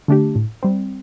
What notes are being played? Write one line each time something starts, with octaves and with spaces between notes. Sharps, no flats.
D3 A3 D4 G4
A2
G3 C4